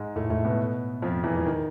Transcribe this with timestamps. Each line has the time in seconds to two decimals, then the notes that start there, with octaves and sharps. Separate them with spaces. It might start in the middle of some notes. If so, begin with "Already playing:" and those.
Already playing: G#2 G#3
0.16 A2 A3
0.30 A2 A3
0.45 B2 B3
1.02 F2 F3
1.24 E2 E3
1.35 E3
1.45 D#3